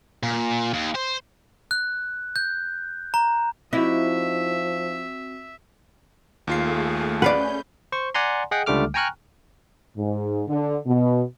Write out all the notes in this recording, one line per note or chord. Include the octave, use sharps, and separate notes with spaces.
A#2
D#2
C5
F#6
G6
A#5
F3 C4 D#4 E4 F#4 E5
D#2 A3 F4 G#4 C7
C#4 B4 D5 F5 F#5 G6
C5 C#6
D5 F#5 G#5 A#5 C6
G#4 D#5 F#5 G5
C#2 D3 G3 A3 D6 F6
G5 G#5 A#5 C#6 F6 F#6
G#2
D3
B2